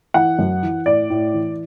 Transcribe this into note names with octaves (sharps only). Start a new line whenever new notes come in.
E3 F#5
F#2
E3
A2 D5
A2
E3